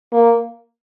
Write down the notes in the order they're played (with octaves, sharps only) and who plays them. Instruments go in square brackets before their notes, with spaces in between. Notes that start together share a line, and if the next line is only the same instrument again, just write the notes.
[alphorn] A#3